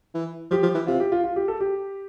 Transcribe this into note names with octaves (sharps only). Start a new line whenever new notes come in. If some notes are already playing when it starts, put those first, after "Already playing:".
E3
F3 G4
F3
E3
C3 F4
G4
F4
F4
G4
A4
G4